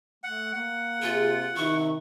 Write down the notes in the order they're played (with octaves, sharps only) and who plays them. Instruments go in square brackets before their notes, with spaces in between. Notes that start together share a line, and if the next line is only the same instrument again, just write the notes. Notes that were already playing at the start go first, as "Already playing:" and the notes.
[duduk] A3 [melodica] F#5
[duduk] A#3 [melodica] F#5
[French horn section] C3 G#4 [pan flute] F4
[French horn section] C3 D#3 E4 [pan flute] C#6